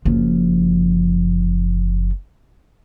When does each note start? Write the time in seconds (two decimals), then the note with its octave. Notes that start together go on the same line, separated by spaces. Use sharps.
0.05 F#1 F3